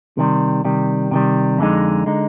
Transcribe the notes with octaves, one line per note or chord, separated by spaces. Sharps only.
C3 D#3 G3
C3 D#3 G3
C3 D#3 G3
F2 D3 G#3 D#4
D3 G#3 D#4